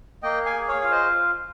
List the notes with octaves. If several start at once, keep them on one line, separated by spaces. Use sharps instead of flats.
A#3 D#5 G5
F5 G#5
G#4
C#5 F5
F4 F5
C5 D#5